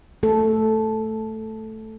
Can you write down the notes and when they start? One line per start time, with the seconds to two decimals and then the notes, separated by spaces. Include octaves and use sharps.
0.23 A3 A4